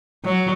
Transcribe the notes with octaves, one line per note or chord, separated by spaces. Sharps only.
F#3